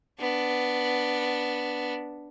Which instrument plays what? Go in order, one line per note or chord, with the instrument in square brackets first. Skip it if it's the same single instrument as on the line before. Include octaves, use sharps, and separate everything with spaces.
[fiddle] B3 D4